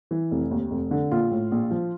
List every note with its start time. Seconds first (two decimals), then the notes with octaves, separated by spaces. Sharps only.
0.11 E3
0.31 F1
0.51 D#2
0.71 F1
0.91 D3
1.11 A#1 F4
1.31 A2
1.52 A#1
1.71 F3